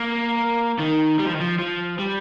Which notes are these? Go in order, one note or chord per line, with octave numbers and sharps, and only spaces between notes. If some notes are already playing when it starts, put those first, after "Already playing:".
Already playing: A#3
D#3
G3
F3
D#3
F3
F3
G3